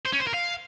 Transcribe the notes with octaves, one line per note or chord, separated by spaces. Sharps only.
C5
C#4
C5
A#4
F5